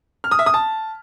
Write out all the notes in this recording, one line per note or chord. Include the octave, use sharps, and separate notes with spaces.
F6
D#6
E5
D#6
A5